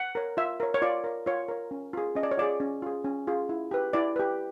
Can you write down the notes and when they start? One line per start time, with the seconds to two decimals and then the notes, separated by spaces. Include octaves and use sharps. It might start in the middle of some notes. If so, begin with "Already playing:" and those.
Already playing: F#5
0.15 A#4 C#5
0.37 F4 E5
0.60 A#4 C#5
0.74 C#5
0.82 F4 D5
1.04 A#4 C#5
1.26 F4 C#5
1.48 A#4 C#5
1.71 C#4
1.93 F4 G#4
2.15 C#4 D#5
2.23 D5
2.31 C#5
2.38 F4 G#4 D5
2.60 C#4
2.82 F4 G#4
3.05 C#4
3.27 F4 G#4
3.49 E4
3.71 G4 B4
3.93 E4 D5
4.16 G4 B4